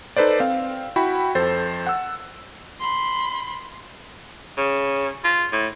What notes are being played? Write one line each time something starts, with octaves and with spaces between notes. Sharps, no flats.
D#4 A4 B4 C5 D5
C4 F5
E4 F#4 G5 B5
F2 A4 C5 A6
F#5 E6
B5 C6
C#3
F4
A2